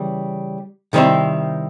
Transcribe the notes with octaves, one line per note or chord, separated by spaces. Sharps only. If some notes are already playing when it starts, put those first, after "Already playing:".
Already playing: C#3 E3 G3
C3 D#3 G3 C4 E4